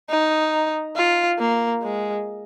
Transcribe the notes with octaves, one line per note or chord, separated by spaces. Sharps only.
D#4
F4
A#3
G#3